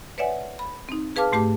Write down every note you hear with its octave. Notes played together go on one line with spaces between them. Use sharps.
B4 C#5 D5 E5 F#5 G#5
B5
C4 D#4
G#4 B4 F5 A5 D6 F6
G#2 A3 G4 A5 D6